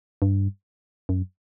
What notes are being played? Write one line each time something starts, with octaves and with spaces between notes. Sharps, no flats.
G2
F#2